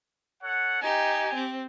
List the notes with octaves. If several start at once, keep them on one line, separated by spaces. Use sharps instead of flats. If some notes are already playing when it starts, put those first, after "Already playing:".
A4 C#5 F#5
D#4 G4 G#5
C4